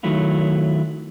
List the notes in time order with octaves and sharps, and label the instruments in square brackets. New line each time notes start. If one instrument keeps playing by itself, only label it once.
[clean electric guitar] D#3 F#3 A3 E4 F4